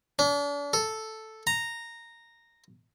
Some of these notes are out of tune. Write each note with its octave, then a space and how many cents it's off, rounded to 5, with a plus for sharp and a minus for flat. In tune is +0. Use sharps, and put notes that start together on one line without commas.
D4 -40
A4 +0
A#5 -10